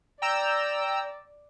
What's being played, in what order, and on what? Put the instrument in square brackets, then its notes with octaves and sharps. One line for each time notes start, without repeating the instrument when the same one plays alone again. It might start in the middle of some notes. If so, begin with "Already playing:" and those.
[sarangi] D5 [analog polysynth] G5 A#5 E6